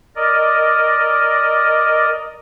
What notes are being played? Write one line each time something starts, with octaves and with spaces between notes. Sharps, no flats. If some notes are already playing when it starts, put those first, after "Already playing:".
A#4 D5 D#5